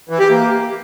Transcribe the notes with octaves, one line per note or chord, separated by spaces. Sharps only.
E3
G4
A#3